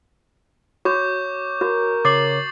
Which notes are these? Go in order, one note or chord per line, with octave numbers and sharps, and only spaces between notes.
F#4 C#5 C#6 D6 G6
F#4 A#4
C#3 C#5 D6 A6 C7 F#7